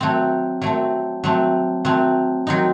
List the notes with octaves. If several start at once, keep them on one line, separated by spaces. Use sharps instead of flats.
F#3 A3 C4
F#3 A3 C4
F#3 A3 C4
F#3 A3 C4
F#3 C4 D#4